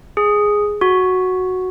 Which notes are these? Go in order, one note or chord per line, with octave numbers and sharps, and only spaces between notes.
G#4
F#4